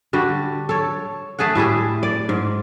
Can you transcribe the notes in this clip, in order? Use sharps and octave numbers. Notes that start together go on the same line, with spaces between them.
D3 G3 F#4
A4 C#5
A3 G#4 A4 F#5
A2 G3 E4 G#4
D5
G#2